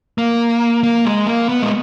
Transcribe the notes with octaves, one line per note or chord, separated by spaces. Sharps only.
A#3
A#3
G#3
A#3
B3
G#3